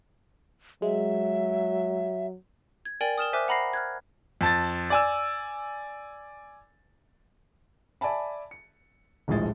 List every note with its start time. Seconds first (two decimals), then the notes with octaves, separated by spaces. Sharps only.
0.82 F#3 G#3 E5
2.85 G#6
3.01 A#4 D5 G5 G#5 A6 F#7
3.18 D#6 F6 E7 G7
3.33 C5 E5 G#5 D6 F6 F#6
3.48 F#5 A#5 B5 A#6 C7
3.73 F6 F#6 G#6
4.41 F2 A5 A6
4.90 D5 G#5 E6
8.01 D5 E5 G#5 A5 B5
8.51 C#7
9.28 D#1 A#1 A2 F3 G#3 A6